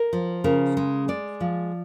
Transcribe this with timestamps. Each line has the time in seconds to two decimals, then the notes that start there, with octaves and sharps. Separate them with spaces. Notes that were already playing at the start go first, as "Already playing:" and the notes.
Already playing: A#4
0.13 F3
0.44 C#3 A#4
0.77 G#3
1.08 G#3 D5
1.41 F3